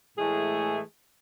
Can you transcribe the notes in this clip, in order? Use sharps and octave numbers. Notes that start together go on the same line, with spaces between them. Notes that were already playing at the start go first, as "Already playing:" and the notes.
A2 E3 G#3 A3 G#4